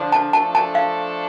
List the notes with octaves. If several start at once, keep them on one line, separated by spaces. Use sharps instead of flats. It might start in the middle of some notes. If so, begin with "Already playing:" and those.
Already playing: D3 F3 D4
A5
F3 A3 D4 A4 A5
A5
F5